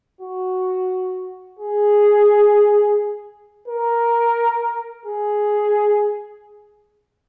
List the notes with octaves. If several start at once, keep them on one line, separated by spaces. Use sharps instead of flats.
F#4
G#4
A#4
G#4